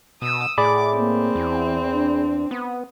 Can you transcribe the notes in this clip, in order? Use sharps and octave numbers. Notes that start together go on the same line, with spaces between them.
B2 D#6 E6
A2 G#4 D5 B5 D6
A#3 C4
E2 E3
D4
B3 D#6